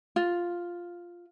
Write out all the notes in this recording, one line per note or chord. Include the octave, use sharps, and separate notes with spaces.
F4